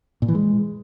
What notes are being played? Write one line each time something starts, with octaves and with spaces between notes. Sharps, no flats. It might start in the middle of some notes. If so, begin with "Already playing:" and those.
A#2
E3
G#3